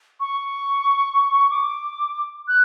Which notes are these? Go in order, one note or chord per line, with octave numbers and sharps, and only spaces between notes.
C#6
D6
F#6